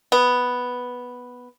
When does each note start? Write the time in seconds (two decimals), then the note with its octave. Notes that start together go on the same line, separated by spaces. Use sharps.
0.12 B3